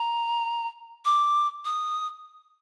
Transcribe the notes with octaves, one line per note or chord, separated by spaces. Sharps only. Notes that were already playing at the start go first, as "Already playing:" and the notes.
Already playing: A#5
D6
D#6